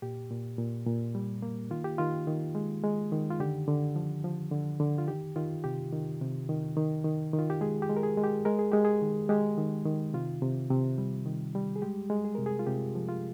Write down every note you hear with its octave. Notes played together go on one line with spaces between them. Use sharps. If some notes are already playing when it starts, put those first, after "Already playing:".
A#2 G4
A#2
A#2
A#2
G3
A#3
D#3 F4
G4
D#3 F4
D#3
G#3
G#3
D#3
F4
D3 G4
D3
F3
F3
D3
D3
F4
D#3 G4
D#3 F4
C3 G4
D#3
C3
D#3
D#3
D#3
D#3
F4
G4
G#3 G#4
G4
G#3
A#4
G#4
G#3
G4
G#3 A#4
G#4
G#3 G4
G#4
D#3
G#3 G4
D#3
D#3
C3 F4
C3
C3
G3
D#3
G3
G#4
G#3 G4
G#3
G#4
C3 A#4
G#4
F4
C3 G4
F3
F4